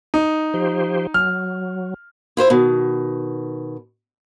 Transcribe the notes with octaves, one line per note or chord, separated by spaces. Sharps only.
D#4
F3 G4 C5
F#3 F6
E4 F4 C5 E5
B2 D#3